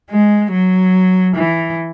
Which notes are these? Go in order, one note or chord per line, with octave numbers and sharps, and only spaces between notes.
G#3
F#3
E3